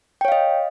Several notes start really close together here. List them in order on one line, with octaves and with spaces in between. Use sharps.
G5 C#5 F5 D#5